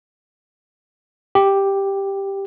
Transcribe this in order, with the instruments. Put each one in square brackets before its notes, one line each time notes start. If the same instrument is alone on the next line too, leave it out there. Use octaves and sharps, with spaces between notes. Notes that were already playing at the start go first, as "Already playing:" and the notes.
[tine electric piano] G4